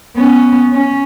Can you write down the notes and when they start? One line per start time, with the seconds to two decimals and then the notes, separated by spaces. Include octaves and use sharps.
0.16 B3 C#4
0.73 C#4